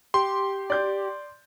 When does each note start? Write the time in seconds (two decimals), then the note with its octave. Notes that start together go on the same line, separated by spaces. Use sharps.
0.14 G4 C6
0.70 D5 G6